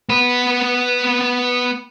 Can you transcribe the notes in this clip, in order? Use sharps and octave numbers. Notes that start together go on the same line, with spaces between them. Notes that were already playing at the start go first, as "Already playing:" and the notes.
B3 B4